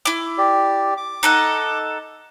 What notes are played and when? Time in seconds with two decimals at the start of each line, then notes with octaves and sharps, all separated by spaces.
0.05 E4 D6
0.38 G4 D5
0.97 D6
1.23 D#4 A4 F#5